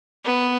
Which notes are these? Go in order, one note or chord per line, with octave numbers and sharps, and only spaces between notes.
B3